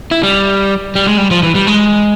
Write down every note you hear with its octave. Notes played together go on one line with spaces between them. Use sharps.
E4
G3
G3
G#3
G3
F3
E3
G3
G#3